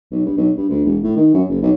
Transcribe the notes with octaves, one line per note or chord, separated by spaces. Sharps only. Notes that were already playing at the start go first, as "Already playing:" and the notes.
B1
G2
B1
G2
D2
E1
A2
D#3
F#2
F#1
B1